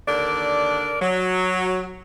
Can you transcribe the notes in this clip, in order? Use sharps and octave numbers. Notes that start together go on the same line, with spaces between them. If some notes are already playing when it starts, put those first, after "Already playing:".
D#2 D3 D4 A#4 D5
F#3